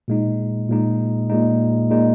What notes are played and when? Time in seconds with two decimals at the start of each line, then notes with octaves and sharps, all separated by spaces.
0.08 A#2 G#3 D#4
0.69 A#2 G#3 D#4
1.30 A#2 G#3 D#4
1.90 A#2 G#3 D#4